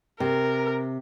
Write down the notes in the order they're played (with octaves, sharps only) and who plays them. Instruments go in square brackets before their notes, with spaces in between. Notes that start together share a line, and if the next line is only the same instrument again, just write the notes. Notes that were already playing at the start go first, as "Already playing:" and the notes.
[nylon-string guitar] C3 [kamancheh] A#4